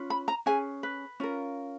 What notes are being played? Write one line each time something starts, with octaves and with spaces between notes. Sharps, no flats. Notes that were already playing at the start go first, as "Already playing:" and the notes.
Already playing: C#4 F4 B4
B5
A#5
C#4 G#4 B4 G#5
B4
C#4 F4 A#4